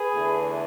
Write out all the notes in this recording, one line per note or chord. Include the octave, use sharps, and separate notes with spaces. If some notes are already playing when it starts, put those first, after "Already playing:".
Already playing: G#4 B4
E2 D3 A3